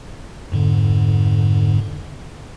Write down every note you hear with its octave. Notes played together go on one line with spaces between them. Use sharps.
F2 G#2 D3